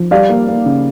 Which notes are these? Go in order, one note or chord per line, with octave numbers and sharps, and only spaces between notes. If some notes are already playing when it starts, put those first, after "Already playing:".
Already playing: F3
G3 D5 F5
A#3
A#3
C#3